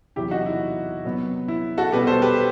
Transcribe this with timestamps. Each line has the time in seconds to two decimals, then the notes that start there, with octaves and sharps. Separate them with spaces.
0.16 E2 C3 F#3 E4 G4
0.31 D#4 F#4
0.46 E4
1.05 C3 F#3 B3
1.48 E4
1.78 F#4 A4
1.92 B2 G3 B3 G4 B4
2.07 A4 C5
2.22 G4 B4